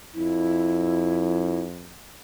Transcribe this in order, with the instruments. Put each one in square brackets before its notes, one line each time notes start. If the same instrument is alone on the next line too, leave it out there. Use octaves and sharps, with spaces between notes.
[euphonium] F2 [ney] E4